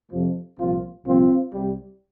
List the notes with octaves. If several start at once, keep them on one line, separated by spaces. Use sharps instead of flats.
F2 C3 F3
C2 A#2 F3 C4 F4
C2 A#2 F3 C4 F4
C2 C3 G3